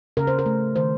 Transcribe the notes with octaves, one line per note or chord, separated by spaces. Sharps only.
C#3 A#4
C5
A#4
A3
D#3 C5